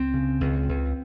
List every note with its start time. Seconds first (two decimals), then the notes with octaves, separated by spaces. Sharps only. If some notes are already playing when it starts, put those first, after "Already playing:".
Already playing: C#2 C4
0.14 C#3
0.41 C#2
0.69 C#2